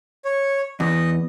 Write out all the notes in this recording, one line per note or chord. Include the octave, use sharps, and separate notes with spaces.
C#5
E2 D#5